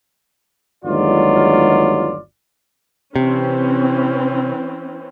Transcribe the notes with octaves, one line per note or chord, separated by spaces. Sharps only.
G1 D#2 F#3 G#3 F4 D5
C3 E3 C4 C#4